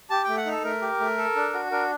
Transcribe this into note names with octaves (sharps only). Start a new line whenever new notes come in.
G4 A5
A3 G5
F#5
D#4 A4
A3 A#4
G4
A3
A4
D4
F#4
D4 A#4